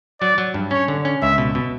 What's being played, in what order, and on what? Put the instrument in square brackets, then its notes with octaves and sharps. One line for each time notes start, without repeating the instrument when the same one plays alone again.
[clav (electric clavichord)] F#3 [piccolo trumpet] D5
[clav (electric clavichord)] F#3
G2
[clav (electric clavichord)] C#4 [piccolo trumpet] C#5
[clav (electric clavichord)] D3
C#4
[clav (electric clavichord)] C#2 [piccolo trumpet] E5
[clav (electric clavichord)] B2
B2